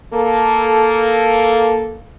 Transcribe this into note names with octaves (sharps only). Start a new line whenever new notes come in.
A#3 A4